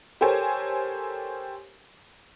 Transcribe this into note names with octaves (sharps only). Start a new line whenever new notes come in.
G4 A4 A#4 C5 C#5 G#5